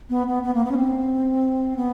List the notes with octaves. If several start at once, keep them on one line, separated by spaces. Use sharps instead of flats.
B3
B3
B3
A#3
B3
C#4
C4
B3